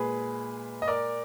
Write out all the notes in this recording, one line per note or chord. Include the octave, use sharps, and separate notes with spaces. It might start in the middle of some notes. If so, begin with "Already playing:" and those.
Already playing: A#2 G#3 G#4 B4
D#5
A#4 D5